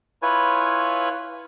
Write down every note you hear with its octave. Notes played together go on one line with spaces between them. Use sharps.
E4 F4 B4 C#5 G#5